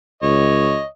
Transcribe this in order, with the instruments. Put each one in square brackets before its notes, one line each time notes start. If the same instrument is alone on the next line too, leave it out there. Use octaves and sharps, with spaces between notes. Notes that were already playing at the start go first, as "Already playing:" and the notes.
[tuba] C#2 [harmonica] C#5 D#5